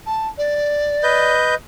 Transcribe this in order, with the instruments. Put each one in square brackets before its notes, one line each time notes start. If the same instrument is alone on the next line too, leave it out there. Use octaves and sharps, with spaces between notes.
[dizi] A5
D5
[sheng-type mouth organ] B4 D#5 G6